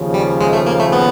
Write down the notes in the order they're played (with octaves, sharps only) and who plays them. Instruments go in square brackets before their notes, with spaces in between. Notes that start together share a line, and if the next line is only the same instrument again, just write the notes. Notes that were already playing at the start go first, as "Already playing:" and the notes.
Already playing: [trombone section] D#2 C#3 F3
[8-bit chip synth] G3
G#3
A3
A#3
A3
B3